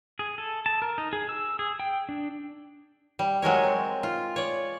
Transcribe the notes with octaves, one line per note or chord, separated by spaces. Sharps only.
G#4
A4
A5
A#4
D#4
G#4
E6
G#4
G5
D4
G3
F#3 G#3 A#4 C#5
C4
F4
C#5 D5